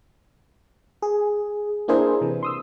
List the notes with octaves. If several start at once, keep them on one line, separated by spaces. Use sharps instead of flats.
G#4
A#3 D4 E4 G#4 A#4 C5
C3 E3
C6 D#6 E6